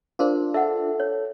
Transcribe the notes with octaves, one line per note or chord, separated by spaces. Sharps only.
D4 F4 G#4 A#4 C5
A4 E5 F#5
C#5